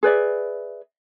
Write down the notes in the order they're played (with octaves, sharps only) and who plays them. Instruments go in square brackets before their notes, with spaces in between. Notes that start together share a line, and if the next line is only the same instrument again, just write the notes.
[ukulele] G#4 B4 D5 E5